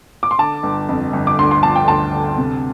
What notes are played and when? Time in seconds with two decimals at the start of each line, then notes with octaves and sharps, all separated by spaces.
0.23 D6
0.31 C6
0.38 D3 A5
0.63 G1
0.89 F2
1.13 G1
1.27 D6
1.39 D2 C6
1.51 C6
1.63 F3 A5
1.76 G5
1.88 D2 A5
2.13 D3
2.37 C3